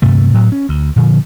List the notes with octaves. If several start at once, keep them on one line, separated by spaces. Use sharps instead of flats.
D2 G2 C3 A3
A2 F#3
C#4
D2
A#2 D3 F3